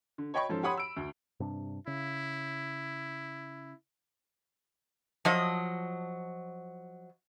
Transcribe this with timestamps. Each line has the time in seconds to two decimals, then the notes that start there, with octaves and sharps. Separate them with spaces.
0.18 D3
0.34 C#5 D#5 G5 B5 C#6
0.49 G#2 F3 C#4 A4
0.63 G4 C#5 F#5 B5 C6 D#6
0.76 B5 E6 D7
0.96 D2
1.40 G2 C3 D4
1.87 C#3 E4
5.25 F3 F#3 D#5